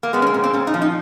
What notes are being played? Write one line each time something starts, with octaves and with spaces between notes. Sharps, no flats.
A#3
G#3 B3
C#4
C4
A#2
C4
A#2 C#4
D#4
F3
D#4